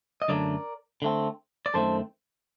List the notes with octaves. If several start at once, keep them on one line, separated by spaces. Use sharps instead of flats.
D#5
F#2 D3 F#3 A3 D4 A#4 D5
D3 A3 C4
D5
F#2 D#3 A3 C4 A4 C5